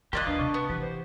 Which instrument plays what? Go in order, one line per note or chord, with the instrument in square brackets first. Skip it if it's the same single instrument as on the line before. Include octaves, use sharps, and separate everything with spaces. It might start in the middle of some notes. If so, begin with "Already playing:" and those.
[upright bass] D#3 [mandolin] A#3 F4 D#5 [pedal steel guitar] G4 D5 F#6
[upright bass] D#2 [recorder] D4 [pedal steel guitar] B4 F5 D#6
[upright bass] C3 [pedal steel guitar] A5 C#6
[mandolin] B3
[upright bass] E3 [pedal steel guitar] G4 [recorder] B4
[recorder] C5